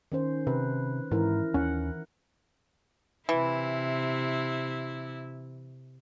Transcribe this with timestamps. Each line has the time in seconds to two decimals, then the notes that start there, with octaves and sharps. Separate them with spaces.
0.12 D#3 C#4 C5
0.47 C3 B4
1.11 G#2 E3 E4 A#4
1.54 D#2 C#4 F#5
3.29 C3 E3 E4